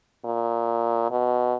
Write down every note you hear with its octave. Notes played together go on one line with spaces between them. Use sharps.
A#2
B2